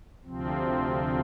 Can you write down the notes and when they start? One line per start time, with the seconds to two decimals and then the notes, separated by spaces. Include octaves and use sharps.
0.25 D2 C3 F3 C4